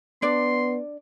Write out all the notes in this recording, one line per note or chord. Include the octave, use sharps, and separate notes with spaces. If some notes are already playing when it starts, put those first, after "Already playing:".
B3 D4 D5 C6